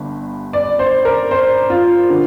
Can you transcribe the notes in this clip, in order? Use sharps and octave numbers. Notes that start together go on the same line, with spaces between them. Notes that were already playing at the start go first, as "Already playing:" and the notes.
Already playing: G1 G2
D5
C5
A#4
C5
F4
D3